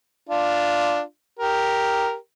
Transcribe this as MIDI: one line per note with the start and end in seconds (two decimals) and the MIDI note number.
0.29 1.01 62
0.29 1.01 65
1.39 2.14 67
1.39 2.14 70